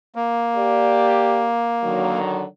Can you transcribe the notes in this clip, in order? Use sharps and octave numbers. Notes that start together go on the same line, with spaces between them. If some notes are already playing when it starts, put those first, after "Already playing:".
A#3
G4 D5
D3 D#3 F#3